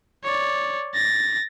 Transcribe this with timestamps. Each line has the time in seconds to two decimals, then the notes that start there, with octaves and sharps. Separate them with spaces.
0.23 C#5 D5
0.94 A6 A#6